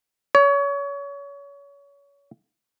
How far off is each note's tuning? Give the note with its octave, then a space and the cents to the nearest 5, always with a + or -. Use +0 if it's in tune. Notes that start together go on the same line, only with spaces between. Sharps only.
C#5 +30